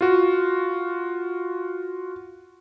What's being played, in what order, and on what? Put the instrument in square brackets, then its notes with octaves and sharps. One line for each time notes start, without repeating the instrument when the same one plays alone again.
[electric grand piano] F4 F#4